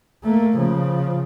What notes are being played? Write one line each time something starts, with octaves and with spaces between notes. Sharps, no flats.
A3 A#3
C#3 F3